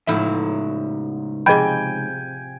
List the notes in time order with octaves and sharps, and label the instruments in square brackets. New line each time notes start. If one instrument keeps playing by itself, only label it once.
[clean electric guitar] C#2 D#4 E5 [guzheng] A2 F3 E4
[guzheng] C3 F3 [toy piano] G#4 D#5 B5 [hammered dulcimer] G5 G#5